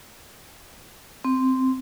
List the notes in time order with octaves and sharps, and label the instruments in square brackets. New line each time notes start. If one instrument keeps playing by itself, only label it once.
[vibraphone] C4